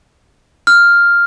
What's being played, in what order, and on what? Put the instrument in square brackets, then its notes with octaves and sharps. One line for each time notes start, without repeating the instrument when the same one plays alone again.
[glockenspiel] F6